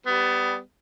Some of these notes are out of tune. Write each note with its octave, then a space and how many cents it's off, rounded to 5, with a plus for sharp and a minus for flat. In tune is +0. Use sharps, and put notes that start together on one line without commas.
G3 +0 B3 +20